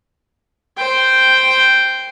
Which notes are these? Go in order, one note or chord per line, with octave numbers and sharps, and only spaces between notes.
C5 G5